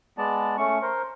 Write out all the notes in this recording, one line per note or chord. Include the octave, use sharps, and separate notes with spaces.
G#3 B3 D5 A5
A3 C#4 C#6
A#4 C5